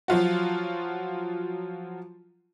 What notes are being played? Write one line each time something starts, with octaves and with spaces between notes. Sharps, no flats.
F3 F#3 F4 F#4